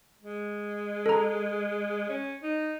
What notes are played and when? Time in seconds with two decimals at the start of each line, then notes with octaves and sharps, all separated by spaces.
0.23 G#3
1.06 A4 A#5
2.09 C#4
2.43 D#4